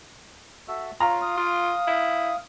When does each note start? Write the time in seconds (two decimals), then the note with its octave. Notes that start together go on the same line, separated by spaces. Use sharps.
0.68 F#4 A4 E5
1.00 F4 C#5 F5 A#5
1.22 F5 D#6
1.37 F4
1.87 E4